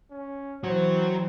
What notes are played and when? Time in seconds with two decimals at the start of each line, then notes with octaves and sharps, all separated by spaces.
0.11 C#4
0.64 E3 F#3 C4 C5